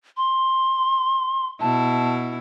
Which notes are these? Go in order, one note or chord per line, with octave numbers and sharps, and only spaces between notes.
C6
B2 E4 A5